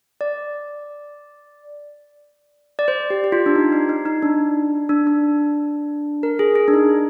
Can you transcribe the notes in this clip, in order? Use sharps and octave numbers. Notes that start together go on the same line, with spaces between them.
D5
D5
C5
G4
G4
F4
D4
D#4
D#4
D#4
D#4
D4
D4
D4
A#4
G#4
G#4
D4
D#4